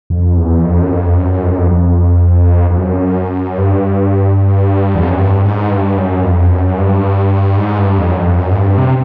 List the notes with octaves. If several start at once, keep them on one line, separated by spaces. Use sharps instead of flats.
F2
E2
F2
F#2
F2
F#2
F2
F#2
F2
F2
F2
F#2
G2
E2
F2
F#2
G2
G#2
G2
F#2
F2
F#2
G2
G#2
G2
F2
F#2
F2
F#2
G#2
G2
C3